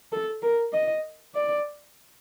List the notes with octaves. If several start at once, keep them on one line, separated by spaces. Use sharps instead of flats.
A4
A#4
D#5
D5